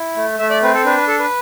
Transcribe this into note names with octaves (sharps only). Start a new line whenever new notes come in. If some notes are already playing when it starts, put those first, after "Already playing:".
Already playing: E4
A3
A3 E5
D5
C4 B4
A4
D4 B4
B4
A4
B4